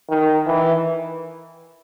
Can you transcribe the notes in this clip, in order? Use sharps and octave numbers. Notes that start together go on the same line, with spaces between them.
D#3
E3